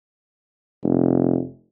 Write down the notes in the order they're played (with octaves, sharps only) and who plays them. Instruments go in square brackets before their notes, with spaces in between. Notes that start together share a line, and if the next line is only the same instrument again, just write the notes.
[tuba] F1